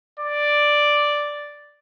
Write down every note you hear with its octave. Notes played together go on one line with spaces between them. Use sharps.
D5